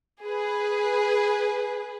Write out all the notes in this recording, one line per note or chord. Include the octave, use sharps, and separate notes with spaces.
G#4 B4